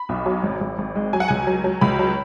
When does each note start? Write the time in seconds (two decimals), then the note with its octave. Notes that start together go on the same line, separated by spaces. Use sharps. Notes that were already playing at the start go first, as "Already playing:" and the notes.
Already playing: B5
0.09 B1
0.26 F#3
0.43 G#1
0.61 G#1
0.78 G#1
0.95 G#3
1.13 F#3 G#5
1.20 F#5
1.28 C#2 G#5
1.47 F#3
1.64 F#3
1.81 C#2 B5
1.99 F#3